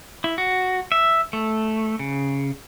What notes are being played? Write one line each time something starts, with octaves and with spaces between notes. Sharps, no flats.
E4
F#4
E5
A3
C#3